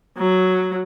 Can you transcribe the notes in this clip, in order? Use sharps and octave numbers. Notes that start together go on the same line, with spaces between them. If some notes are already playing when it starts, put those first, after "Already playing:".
F#3